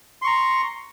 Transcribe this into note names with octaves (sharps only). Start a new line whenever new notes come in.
A#5 C6 C#6